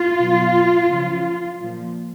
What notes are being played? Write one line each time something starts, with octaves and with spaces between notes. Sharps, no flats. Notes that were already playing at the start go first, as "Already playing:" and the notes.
Already playing: F4
B2 F#3
C#3 F3
A#2 F3